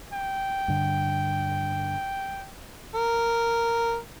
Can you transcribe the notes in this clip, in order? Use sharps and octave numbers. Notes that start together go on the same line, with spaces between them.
G5
G2 D3
A#4